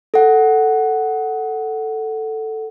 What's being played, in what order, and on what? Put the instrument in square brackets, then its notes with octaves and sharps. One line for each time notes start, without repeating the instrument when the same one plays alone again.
[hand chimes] A4 F#5